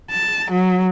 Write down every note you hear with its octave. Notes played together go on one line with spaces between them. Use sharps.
A5
F#3